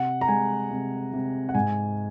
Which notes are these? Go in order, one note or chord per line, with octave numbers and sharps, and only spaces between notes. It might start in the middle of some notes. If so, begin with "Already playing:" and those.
Already playing: C3 F#5
A#5
G#3 G#5
C3
C3
F#5
G#2 G#5